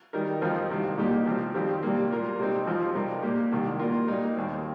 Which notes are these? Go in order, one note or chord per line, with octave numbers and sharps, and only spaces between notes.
D#3 G3 D#4 A#4
F2 F3 C4 D#4 A#4
C2 C3 D#3
C2 A#2 A#3 D#4 G4
C3 F3 C4
F2 D#3 G3 C4 G4
C3 G3 A#3
A#2 A#3 F4 A#4
C3 G3 C4 D#4
F2 F3 C4 F4
C3 G3 D#4 A#4
A#2 A#3 G4
C2 C3 D#3
A#2 A#3 F4 A#4
A#2 G3 D#4 A#4
D#2 D#3 C4